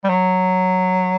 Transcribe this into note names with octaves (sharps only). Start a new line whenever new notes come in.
G3
F#3